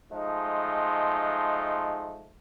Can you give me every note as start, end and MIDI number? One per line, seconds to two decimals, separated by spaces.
0.11 2.29 53
0.11 2.29 56
0.11 2.29 57
0.11 2.29 63